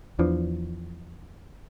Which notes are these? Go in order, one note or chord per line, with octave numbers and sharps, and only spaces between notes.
E2 E3 F3 D4